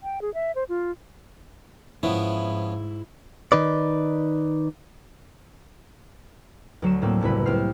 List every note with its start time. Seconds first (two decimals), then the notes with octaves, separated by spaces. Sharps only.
0.03 G5
0.22 G#4
0.34 E5
0.55 C5
0.69 F4
2.03 G#2 F3 B3 C#4 E4
3.52 D#3 D#4 B4 D5
6.82 D2 F#3 C7 E7
7.02 A2 A3 A#3 C4
7.21 F#1 C2 E4 B4
7.46 C2 C4 C5 F6 C7